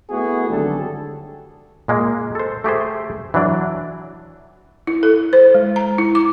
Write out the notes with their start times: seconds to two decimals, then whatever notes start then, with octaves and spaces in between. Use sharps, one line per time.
0.11 A3 B3 E4 F#4 G#4
0.49 G#1 D3 F#3 G3 G4 A4
1.88 A#2 G#3 A#3
2.35 A4 C5
2.64 A3 G4 G#4 C5
3.34 E3 F#3 D4 D5
4.87 E4
5.03 A4
5.33 C5
5.54 G#3
5.76 A#5
5.98 E4
6.15 D6